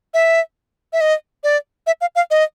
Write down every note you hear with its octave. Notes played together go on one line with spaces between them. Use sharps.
E5
E5
D#5
D5
E5
F5
F5
D#5